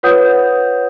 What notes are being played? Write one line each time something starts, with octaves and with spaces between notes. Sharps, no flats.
F4 B4 C#5 F#5 D#6 G6